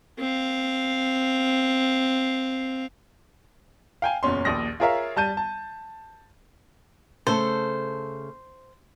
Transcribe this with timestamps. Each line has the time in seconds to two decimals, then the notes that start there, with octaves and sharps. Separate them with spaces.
0.19 C4 F5
4.02 F5 G5 G#5
4.23 F#1 E2 A#2 C#4 C6
4.45 A#1 D#2 A#2 D#6 A#6
4.80 F4 G#4 A#4 C#5 E5 F5
5.16 G3 A5 G6 D#7
5.37 A5
7.27 C#3 A3 A4 C5